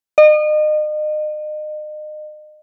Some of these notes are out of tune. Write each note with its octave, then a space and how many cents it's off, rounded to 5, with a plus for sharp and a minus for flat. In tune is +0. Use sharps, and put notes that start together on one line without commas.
D#5 -35